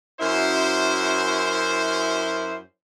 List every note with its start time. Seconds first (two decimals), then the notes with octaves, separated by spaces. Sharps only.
0.20 F#2 E4 C5